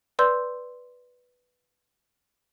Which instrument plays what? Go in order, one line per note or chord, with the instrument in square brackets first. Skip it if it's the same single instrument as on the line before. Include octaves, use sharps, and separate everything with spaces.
[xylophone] B4 D5 C6 E6 G6